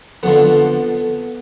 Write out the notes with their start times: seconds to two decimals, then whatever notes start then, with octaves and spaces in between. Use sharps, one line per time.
0.23 F2 D3 F3 B3